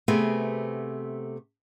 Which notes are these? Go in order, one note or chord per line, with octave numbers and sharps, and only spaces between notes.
C3 A3 B3 C4 G#4